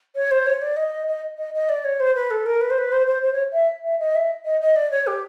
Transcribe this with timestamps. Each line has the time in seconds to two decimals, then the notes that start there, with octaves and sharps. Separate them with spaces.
0.16 C#5
0.31 C5
0.46 C#5
0.62 D5
0.77 D#5
1.07 D#5
1.38 D#5
1.54 D#5
1.69 D5
1.85 C#5
2.00 C5
2.15 B4
2.31 A4
2.46 A#4
2.61 B4
2.70 C5
2.78 B4
2.92 C5
3.07 C5
3.22 C5
3.33 C#5
3.53 E5
3.84 E5
3.99 D#5
4.15 E5
4.45 D#5
4.61 D#5
4.76 D5
4.91 C#5
5.07 G4